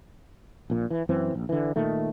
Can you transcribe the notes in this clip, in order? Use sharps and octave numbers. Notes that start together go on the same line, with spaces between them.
A#1 A#2
E3
F#2 E3 C4
A#1
D3 E3
A#2 D#3 A3